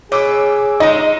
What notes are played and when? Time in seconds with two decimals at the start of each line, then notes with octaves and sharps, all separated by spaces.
0.12 B2 G#4 C#5 D6 E6
0.80 G#3 D#4 D#5